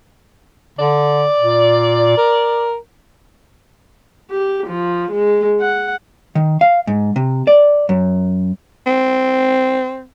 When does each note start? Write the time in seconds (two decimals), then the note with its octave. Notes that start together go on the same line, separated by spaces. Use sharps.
0.79 D3 D5
1.39 A#2
2.17 A#4
4.31 G4
4.67 F3
5.12 G#3
5.61 F#5
6.35 D#3
6.61 F5
6.87 G#2
7.16 C3
7.47 D5
7.89 F#2
8.86 C4